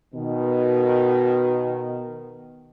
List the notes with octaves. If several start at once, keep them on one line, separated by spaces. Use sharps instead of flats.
B2 D#3